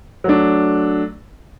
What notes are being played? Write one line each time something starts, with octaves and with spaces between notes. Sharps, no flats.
F#3 A3 D4